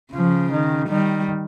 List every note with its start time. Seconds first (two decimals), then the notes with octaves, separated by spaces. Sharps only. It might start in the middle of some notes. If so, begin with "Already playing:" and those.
0.13 C#3 F3
0.52 D#3
0.89 D#3 G3